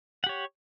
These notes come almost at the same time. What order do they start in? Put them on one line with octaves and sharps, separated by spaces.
F#5 G4 C#5